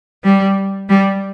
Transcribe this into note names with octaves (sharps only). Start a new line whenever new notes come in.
G3
G3